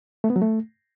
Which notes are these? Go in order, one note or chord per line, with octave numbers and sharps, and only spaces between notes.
A3
B3
F#3
A3